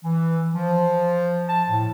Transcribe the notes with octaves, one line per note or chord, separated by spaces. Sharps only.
E3
F3
A5
A2